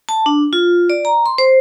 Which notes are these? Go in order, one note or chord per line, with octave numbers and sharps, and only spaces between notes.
A5
D4
F4
D5
A#5
C6
C5